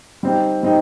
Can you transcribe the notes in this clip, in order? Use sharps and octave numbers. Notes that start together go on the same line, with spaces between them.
G3 C4 D#4 G4
G3 C4 D#4 G4